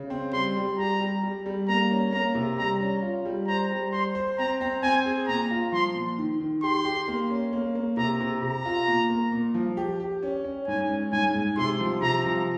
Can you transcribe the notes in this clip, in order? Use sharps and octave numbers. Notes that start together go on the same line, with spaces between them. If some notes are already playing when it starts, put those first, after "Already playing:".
Already playing: C#3
C4
G3 C6
G3
G4 A#5
G3
G3
G3
A#3 A#5
C#4
A#3 A#5
C3
G3 A#5
C#4
F4
G3
C5 A#5
G3
C5 C6
C5
C4 A#5
C4
C4 G#5
G#4
A#2 A#5
F4
F3 C6
A#2
D#3
D#3
G4 C6
G4
A#3
C#4
A#3
A#3
C3 A#5
C3
C3 A#5
F4
A#2
A#3
A#2
F3
G4
G4
C#4
C#4
G#2 G#5
C#4
G#2 G#5
G#2
C3 C6
F3
C3 A#5
F3